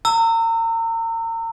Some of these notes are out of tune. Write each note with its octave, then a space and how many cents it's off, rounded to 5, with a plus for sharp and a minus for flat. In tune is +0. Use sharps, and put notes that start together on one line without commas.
A#5 -35 E6 +0